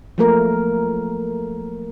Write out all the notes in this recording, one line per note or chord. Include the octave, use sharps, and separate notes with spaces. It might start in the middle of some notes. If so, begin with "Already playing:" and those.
F3 F#3 A3 A#3 A#4